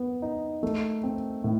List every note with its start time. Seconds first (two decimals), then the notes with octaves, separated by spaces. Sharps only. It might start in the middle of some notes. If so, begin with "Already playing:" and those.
Already playing: B3
0.22 D#4
0.63 A3
1.03 C4
1.44 A2